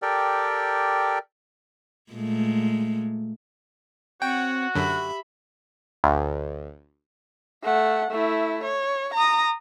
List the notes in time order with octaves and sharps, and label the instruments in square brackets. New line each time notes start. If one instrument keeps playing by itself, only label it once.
[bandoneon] G4 A4 A#4 D5 G5
[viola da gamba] A#2 G#3 A3
[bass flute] C4 [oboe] F#4 [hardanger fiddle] C#5 F#5 [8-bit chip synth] G5
[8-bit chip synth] F#2 D3 [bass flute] G4 [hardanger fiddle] E5 B5
[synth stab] D2
[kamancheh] A3 F#5
A3 E4
C#5
A#5 D#6